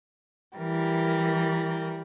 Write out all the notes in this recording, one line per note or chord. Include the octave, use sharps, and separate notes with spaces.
E3 G3 A#4